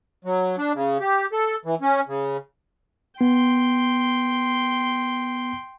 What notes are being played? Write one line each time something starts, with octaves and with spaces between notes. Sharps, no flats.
F#3
D4
C#3
G4
A4
E3
C#4
C#3
B3 G5 C6